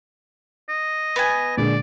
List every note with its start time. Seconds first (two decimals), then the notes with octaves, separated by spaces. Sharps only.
0.69 D#5
1.16 B3 G#5
1.57 A#2 D3 G#3 D5